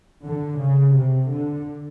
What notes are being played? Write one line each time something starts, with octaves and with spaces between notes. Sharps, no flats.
D3
C#3
C3
D3